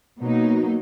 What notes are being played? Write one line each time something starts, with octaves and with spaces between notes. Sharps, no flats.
B2 F#3 A#3 D#4